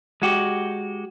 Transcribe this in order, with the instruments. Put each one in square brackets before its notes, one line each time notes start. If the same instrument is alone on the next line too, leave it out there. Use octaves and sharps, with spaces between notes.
[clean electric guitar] G#3 F#4 G4